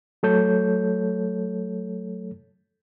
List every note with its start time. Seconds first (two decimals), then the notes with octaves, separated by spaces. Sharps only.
0.23 F#3 A3 A4 C#5 G6